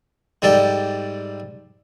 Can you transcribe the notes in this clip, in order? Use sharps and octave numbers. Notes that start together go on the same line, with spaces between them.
G#2 G3 A4 D5 G5